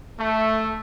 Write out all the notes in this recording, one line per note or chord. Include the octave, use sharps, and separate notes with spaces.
A3